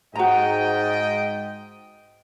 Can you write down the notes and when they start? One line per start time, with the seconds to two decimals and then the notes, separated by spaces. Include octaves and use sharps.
0.16 G#2 F#4 D#5 G5 A#5